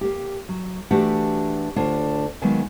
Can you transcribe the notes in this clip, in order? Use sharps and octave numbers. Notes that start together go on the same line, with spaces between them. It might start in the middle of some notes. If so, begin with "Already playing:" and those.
A#3 G4
F#3
E3 A3 D4 F#4 G4 F#5
D2 D4 F4 C#5 F#5
D#3 F#3 G#3 A#3 B3 G#5